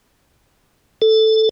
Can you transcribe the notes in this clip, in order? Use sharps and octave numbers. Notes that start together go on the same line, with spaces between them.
A4